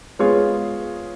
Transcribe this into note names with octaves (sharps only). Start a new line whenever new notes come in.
G#3 B3 F4 G#4 C#5